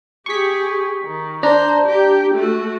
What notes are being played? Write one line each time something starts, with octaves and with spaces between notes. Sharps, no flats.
G4 G#4 C#6 B6
D#3
D4 C5 A#5
G4
A3 F#4